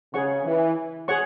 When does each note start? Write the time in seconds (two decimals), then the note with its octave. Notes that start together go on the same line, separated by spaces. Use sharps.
0.13 C#3 G#4 C#5 F#5 C#6
0.44 E3
1.08 G#4 C#5 F#5 C#6